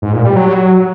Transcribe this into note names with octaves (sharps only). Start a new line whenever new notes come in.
G#2
A#2
G3
F#3